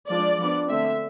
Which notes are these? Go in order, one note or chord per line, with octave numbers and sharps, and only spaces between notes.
F3 G#3 D4 D5
F3 B3 D4
D3 A3 C4 E5